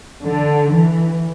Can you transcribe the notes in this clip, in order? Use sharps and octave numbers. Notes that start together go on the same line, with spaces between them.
D3
E3